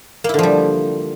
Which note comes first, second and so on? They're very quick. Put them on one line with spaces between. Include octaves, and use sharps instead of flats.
A#3 E4 D3 F3 G3